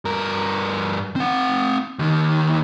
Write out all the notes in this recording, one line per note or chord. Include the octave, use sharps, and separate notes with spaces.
G2 A#4
C4 F#5
D#2 D#3